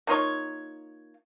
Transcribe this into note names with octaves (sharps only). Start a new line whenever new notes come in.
A#3 D#4 F4 C#5